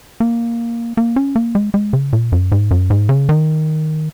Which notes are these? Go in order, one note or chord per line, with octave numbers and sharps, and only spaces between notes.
A#3
A#3
C#4
A#3
G#3
G#3
C#3
A#2
F#2
G#2
F#2
G#2
C#3
D#3